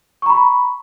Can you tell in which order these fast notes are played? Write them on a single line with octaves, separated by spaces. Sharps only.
C#6 A#5 B5